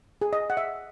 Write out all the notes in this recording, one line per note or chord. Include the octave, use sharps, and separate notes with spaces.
G#4
D#5
F#5
E5